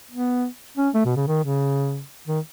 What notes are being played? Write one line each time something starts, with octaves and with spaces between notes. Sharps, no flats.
B3
C#4
A3
B2
C#3
D#3
C#3
D#3